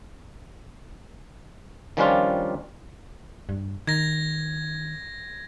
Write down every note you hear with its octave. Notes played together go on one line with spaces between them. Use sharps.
D#3 F3 G3 C#4 D4 F4
G2
D#3 G#6 A#6